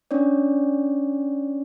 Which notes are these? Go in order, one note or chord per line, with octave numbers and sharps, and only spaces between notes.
C#4 D4 C#5 D5